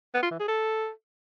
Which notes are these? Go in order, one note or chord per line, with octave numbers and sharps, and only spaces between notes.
B3
F4
E3
G#4
A4